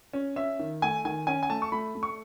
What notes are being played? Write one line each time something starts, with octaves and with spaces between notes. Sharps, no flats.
C#4
C#4 E5
D#3
A3 G#5
D#3 G#5
C#4 G#5
G#5
A3 A5
C#6
A3 B5
A3
C#6